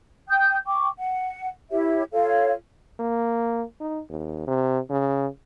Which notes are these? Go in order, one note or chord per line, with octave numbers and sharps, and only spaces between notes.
G5 D#6 G6
G5 C#6 D6
F#5
E4 G4 C#5 E5
F4 A4 C#5 F5
A#3
D#4
D#2
C3
C#3